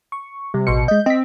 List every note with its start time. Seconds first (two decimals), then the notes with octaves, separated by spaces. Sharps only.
0.12 C#6
0.54 C3 G3
0.67 A1 B2 C6 C#7
0.88 G#3 D#5 G6
1.06 C4 D#5 B6